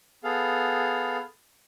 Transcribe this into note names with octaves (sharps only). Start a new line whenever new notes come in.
B3 G#4 A4 F5